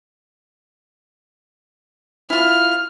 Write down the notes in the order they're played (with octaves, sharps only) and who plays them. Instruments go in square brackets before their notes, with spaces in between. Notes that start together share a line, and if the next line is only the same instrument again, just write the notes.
[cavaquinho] E4 F4 [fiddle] F6